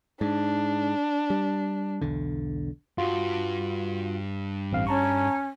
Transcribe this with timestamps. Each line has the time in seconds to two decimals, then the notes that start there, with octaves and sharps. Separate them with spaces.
0.21 G#2 D4
1.30 G3
2.02 B1 E2 D3
2.98 G2 F4 F#4
4.72 A1 C4 F5
4.87 C#4 A5 A#5 C#6